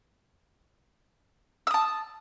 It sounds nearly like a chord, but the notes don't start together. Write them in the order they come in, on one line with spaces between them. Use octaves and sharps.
E6 D#6 A5